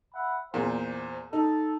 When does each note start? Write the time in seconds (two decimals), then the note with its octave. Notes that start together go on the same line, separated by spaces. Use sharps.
0.14 E5 F#5 B5
0.54 E2 A#2 C5
1.33 D#4 A4